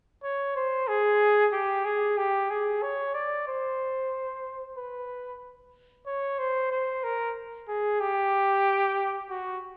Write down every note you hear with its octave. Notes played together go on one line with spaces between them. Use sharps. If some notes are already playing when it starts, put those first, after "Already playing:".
C#5
C5
G#4
G4
G#4
G4
G#4
C#5
D5
C5
B4
C#5
C5
C5
A#4
G#4
G4
F#4